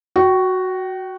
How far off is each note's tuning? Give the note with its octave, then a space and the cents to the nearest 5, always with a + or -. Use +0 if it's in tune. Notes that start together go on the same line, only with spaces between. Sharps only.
F#4 +0 G5 -35